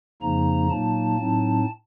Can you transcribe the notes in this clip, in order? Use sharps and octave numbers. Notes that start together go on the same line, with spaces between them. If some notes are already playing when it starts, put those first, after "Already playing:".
F2 C#3 F3 A#3 D#4 A#5
A#2 F#3 A#3 D#4 A5
A2 F#3 C4 D#4